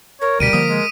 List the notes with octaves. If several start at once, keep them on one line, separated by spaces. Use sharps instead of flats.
A#4 C#5
D2 B2 G3 B6 D7 D#7
D3 F3 A#3 D#6
G#3